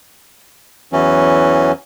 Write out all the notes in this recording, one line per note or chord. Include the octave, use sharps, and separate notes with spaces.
E2 E3 F#3 C#4